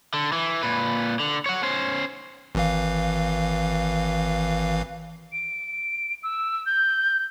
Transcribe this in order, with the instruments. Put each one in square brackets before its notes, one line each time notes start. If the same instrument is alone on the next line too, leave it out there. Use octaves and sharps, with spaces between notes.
[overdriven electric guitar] D3
E3
A#2 B4
D3
C#5 F#5
C#4 C5
[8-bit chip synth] G#1 E3 F5
[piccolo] D7
E6
G6